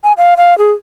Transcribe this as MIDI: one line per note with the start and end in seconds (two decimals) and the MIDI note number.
0.04 0.13 80
0.18 0.34 77
0.37 0.57 77
0.58 0.72 68